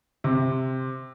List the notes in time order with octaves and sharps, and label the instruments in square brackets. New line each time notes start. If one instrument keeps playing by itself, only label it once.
[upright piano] C3